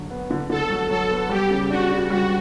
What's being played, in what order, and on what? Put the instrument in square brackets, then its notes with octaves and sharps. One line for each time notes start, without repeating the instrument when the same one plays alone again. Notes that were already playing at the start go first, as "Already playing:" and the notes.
Already playing: [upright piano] D3 F#3
B3
D3
[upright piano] D3 [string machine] A4
[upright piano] F#3
[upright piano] F#3 [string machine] A4
[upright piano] B3
[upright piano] G3 [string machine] G4
[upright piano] C#3
[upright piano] D4 [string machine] F#4
[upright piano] D4
[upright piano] G3 [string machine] F#4